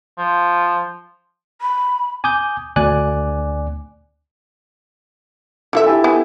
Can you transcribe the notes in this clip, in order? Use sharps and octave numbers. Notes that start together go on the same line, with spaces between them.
F3
B5
G#5 D6 D#6 G6
D2 D5 G#5 D6 F#6
D3 E3 D4 F4 A4 E5
E4 G4 A4 G#5
B3 G#5